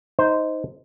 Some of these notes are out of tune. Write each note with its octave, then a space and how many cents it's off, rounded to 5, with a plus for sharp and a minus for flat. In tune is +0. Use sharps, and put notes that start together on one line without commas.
D#4 +15 C5 -10